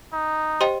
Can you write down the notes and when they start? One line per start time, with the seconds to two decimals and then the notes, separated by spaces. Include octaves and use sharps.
0.12 D#4
0.61 G4 C5 D#5 G5 C6